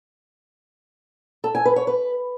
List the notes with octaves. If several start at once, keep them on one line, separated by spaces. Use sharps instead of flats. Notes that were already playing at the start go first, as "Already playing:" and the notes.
A4
G#5
B4
C#5
B4